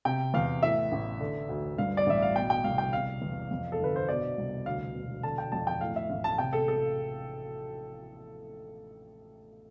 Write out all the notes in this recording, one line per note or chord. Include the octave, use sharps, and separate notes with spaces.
C3 G5
E2 F5
A2 E5
A1
D3
D2
G2 F5
D5
A1 E5
F5
B2 G5
G5
C2 F5
G5
C3 F5
E2
F2
A4
G1 B4
C5
B2 D5
C2
D2 F5
E1
D3 A5
G5
F2 A5
G5
A2 F5
E5
A1 F5
A5
C3 G5
A4
A4